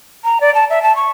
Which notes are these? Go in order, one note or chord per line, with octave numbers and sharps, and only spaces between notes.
A#5
D5
A5
E5
A5
C#6